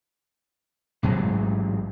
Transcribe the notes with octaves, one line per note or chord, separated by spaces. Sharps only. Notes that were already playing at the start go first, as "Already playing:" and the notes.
A1 G#2 F#3 G#3